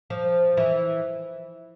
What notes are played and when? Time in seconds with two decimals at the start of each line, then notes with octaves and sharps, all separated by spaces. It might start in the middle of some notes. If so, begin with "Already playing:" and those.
0.10 F3
0.57 E3